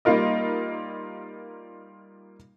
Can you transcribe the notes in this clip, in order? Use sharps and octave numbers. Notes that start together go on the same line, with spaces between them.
G3 A#3 D#4 F4 A#4 D#5